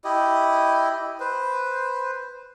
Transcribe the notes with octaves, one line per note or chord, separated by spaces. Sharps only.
E4 G4 D#5
B4 C5